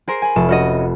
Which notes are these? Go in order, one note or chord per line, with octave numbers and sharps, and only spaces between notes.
G#4 A#4 C5
G#5 B5
F1 A5 E7
C#4 F#4 D#5